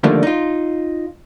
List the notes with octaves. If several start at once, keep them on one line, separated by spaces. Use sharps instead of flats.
D3 D#3 F3 G3 A3 A#3
D#4 F4